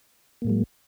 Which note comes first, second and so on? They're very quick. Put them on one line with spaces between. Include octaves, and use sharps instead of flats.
A#3 A2 G#3 F#3